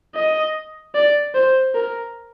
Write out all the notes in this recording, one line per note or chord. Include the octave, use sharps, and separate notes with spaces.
D#5
D5
C5
A#4